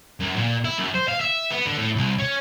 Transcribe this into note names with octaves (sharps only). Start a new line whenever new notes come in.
F#2
A#2
E4
F#2
C5
F5
E5
B3
D3
A2
C2
C#4